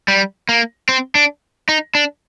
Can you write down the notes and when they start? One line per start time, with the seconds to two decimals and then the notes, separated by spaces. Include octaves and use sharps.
0.08 G3
0.49 A#3
0.89 C4
1.15 D4
1.69 D#4
1.95 D4